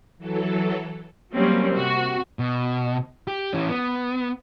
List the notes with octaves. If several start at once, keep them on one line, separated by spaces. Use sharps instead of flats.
E3 F#3 A4
F#3 G3 A#3 C4 C#4
C3 F#4
B2
G4
E3 C#4
B3